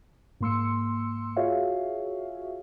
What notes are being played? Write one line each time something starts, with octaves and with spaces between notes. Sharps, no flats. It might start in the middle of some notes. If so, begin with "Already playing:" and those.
G#2 A#3 C6 E6 C#7
F4 F#4 G#4 C#5 E5 F5